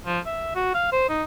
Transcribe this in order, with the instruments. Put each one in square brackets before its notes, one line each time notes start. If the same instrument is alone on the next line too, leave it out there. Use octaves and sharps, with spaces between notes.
[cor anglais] F3
E5
F#4
F5
C5
D#4